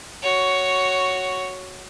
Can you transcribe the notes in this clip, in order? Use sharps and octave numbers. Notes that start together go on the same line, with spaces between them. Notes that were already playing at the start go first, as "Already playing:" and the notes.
F#4 C#5